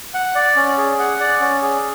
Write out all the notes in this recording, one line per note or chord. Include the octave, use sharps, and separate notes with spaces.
F#5
D5
C#4
G#4
F#5
D5
C#4
G#4